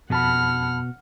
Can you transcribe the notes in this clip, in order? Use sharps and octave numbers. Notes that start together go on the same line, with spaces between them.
F2 B2 F#5 A5 B5 F6